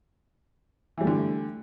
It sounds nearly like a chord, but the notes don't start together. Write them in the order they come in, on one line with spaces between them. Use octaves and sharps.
E3 G3 A3 D3